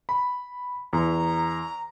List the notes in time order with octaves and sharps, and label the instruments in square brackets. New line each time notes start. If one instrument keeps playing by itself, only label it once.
[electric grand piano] B5
[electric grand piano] E2 [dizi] A#5